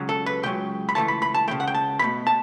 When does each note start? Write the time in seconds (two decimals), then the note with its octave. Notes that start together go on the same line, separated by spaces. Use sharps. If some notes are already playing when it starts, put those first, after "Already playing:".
Already playing: C#2 C#3 F#3
0.09 A4
0.26 B4
0.43 C#2 C#3 F#3 G5
0.89 B5
0.95 C#2 C#3 E3 A3 A5
1.08 B5
1.22 B5
1.34 A5
1.48 C#2 C#3 E3 A3 G5
1.60 F#5
1.68 G5
1.75 A5
1.99 C#2 B2 A3 B5
2.27 A5